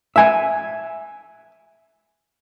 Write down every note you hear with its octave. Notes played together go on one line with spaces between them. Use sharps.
E5 G#5